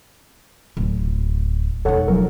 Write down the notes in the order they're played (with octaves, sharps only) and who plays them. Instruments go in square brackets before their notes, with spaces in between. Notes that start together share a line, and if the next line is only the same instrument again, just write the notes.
[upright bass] D1
[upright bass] E1 D#4 [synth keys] A4 C#5 F#5
[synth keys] F3 F#3 A#4